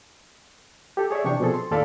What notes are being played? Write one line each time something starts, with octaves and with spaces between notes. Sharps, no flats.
G4 A4
G#4 C#5 D5 E5
C3 E3 D4 G5 C#6
B2 F3 C4 G#4 A4
C6
D#2 A2 A4 D5 F5 B5